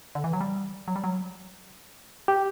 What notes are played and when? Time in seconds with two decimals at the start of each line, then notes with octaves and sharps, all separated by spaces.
0.15 D3
0.24 E3
0.33 F#3
0.41 G3
0.88 F#3
0.96 G3
1.04 F#3
2.28 G4